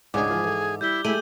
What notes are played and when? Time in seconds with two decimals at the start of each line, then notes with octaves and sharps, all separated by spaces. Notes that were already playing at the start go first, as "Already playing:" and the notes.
0.14 C#2 G#2 D4 D#4 G#4 D6
0.30 E3 F3
0.44 E3 A4
0.81 G3 E4 G6 G7
1.05 G#3 A3 E4 G4 G#4 D#7 F#7